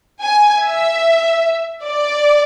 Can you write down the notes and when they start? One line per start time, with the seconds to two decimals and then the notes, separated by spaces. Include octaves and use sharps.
0.23 G#5
0.64 E5
1.85 D5